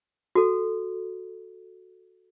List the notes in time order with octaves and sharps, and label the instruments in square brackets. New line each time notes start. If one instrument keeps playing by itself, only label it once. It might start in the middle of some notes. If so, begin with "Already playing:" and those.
[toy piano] F#4 A4